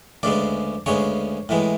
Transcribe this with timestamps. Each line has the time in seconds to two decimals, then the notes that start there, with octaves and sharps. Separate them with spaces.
0.23 D2 C#3 G#3 B3 D5
0.86 D2 C#3 G#3 B3 C#5
1.49 A2 E3 G#3 B3